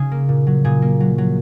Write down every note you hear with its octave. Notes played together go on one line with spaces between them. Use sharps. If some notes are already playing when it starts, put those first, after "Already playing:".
Already playing: C#3 C#4 G#4
A#3
A#2
F#3
A#2 G#4
A#3
F#3
F#3